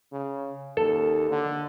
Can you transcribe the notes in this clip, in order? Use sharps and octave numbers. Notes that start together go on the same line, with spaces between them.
C#3
D#2 A4
D3